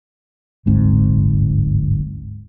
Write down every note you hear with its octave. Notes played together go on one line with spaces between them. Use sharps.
D1 G1 G#2 C4